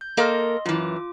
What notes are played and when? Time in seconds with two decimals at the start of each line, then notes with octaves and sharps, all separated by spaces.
0.01 G6
0.17 A#3 A4 A#4 D#5 C6
0.66 F#2 E3 F4 D6